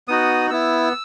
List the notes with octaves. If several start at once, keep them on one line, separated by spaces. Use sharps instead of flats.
B3 D#4 F#4 D#6
B3 E4 E6